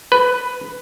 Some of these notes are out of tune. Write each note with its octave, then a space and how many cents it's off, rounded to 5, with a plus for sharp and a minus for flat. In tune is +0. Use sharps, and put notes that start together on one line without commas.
B4 +10